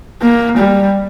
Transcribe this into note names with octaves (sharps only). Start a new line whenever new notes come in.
A#3
G3